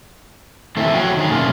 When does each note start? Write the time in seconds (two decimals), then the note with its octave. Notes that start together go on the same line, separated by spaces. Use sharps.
0.77 D#3 E3 A3 C4 E4
0.94 F3 F#3 C#5 G5
1.17 D#3 D#4 G#4
1.30 F#2 B2 A3 A#3 C#4 F4